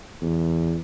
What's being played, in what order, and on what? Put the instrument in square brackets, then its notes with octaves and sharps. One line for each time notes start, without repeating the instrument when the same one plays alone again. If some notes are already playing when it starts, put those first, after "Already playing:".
[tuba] E2